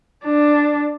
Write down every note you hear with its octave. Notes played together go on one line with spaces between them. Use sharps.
D4